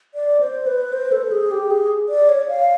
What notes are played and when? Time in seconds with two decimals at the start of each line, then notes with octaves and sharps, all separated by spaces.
0.15 D5
0.41 C5
0.67 B4
0.93 C5
1.12 A4
1.31 G#4
1.51 G4
1.70 G#4
2.09 D5
2.29 C#5
2.48 F5